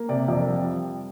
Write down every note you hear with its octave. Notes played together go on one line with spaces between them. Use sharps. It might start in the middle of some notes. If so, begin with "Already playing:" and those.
Already playing: A#3
C3 D5
F2
G3